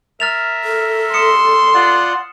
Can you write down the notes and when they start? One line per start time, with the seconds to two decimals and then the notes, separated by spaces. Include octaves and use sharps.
0.20 A#4 E5 F6 A6 F7
0.64 A4
1.13 C6 D#6 C#7 E7
1.74 F4 D5 F#5